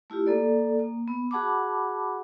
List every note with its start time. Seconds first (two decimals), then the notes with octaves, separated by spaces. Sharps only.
0.10 A3 E4 F4 G4
0.27 A#3 A4 D5
0.79 A#3
1.08 B3
1.31 F#4 G#4 F#5 A5 B5 D6